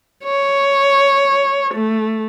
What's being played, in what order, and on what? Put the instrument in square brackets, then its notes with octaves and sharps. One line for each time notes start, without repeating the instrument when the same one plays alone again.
[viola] C#5
A3